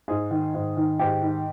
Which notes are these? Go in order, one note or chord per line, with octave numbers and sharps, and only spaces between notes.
G#2 G#4
D#3
G#2
D#3
G#2 G4
D#3